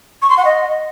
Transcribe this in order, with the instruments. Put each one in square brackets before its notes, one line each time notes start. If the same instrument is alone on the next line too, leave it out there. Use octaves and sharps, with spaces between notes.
[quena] C#6
C6
F#5
D#5